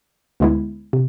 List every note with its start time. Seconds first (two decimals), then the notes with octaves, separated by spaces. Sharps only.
0.40 D2 D3 G#3 B3 E4
0.93 C3